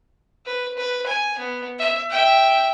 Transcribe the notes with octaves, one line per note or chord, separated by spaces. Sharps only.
B4
B4
G#5
B3
E5
E5 G5